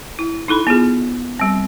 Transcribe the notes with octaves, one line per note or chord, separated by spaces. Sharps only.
E4
D#4 E4 A4 B5
B3 F4 G#4
G3 C4